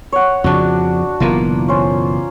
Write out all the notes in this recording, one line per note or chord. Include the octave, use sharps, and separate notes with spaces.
C#5 F#5
F2 C#3 F3 D4 F#4
F#1 B2 E3 A#3 F4
C#4 C5